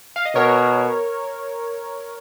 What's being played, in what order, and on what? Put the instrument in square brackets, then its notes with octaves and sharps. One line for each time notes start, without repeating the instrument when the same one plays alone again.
[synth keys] F5
D#5
[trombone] B2 [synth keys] A#4 C#5